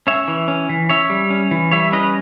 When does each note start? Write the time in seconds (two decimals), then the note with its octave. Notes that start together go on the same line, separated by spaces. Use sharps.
0.07 C#4 C#5 E5
0.28 E3
0.48 C#4
0.69 E3
0.89 C#4 C#5 E5
1.10 G3
1.30 C#4
1.51 E3
1.71 G3 C#5 E5
1.92 C#4 B4 D#5